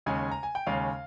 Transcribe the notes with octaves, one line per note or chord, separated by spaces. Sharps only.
D#2 C#3 G#3 C#4 G#5
A#5
G#5
G5
D#2 C#3 G#3 C#4 F5